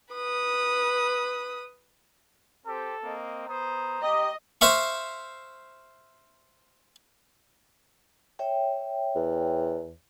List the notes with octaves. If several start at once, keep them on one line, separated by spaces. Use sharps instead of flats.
B4 D#6
C4 G4 A4 C5
A#3 C4 D#5
B3 C5 A#5 D#6
G4 D#5
C5 E5 F5 C#6
C#5 E5 G5
E2